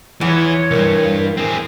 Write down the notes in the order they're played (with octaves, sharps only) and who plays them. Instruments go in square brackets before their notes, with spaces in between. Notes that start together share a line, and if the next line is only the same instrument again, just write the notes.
[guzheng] E2 F4 [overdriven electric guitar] E3 [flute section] C#5
[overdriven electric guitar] C2 G2 [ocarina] A#4
[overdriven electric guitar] C4 G#4